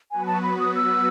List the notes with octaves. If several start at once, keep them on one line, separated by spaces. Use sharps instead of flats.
F#3 B3 F#4 B4 G#5
A5
B5
D#6
E6